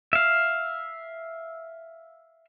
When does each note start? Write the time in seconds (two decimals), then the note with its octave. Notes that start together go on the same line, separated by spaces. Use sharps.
0.13 E5 F5